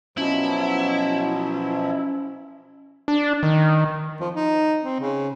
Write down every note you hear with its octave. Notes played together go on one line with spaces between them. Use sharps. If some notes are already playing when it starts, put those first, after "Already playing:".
B2 F3 F#3 C#4 E4
D4
D#3
F3
D#4
C4
C#3